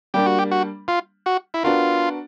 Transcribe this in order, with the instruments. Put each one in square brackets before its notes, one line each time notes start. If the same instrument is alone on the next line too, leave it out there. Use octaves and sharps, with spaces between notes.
[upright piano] G3 A#3 D4 [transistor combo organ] G4
[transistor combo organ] F#4
G4
F#4
F4
F#4
E4
[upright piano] B3 D4 F#4 A#4 [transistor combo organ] F4